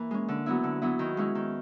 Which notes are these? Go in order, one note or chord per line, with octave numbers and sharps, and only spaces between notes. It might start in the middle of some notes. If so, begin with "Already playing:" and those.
Already playing: E3 A#3
G#3 C#4
D3
F#3 B3 E4
D3
F#3 B3 E4
D#3
G#3 C#4 E4
D#3